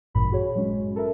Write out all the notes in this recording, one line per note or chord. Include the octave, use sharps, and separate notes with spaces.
A1 G2 A#2 B5
F#4 G#4 C#5
F#3 G#3 C#4
A4 A#4 E5